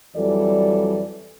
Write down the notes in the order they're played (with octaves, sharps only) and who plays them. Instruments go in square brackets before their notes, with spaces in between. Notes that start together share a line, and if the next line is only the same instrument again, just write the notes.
[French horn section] F2 E3 F#3 G3 A4 D5